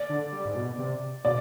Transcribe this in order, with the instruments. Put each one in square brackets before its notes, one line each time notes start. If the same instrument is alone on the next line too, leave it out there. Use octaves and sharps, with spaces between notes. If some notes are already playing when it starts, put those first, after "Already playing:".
Already playing: [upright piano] D5
[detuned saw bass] D3
G3
G#2
B2
C3
[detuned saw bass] B2 [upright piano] D5